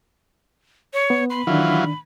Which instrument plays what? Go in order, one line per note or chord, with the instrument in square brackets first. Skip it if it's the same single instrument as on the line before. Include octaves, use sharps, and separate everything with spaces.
[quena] C#5
[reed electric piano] B3
[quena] B5 [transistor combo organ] C6
[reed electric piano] D#3 D4 [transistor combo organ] E3 F#3 F4